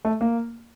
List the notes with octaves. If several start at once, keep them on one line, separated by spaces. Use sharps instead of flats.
A3
A#3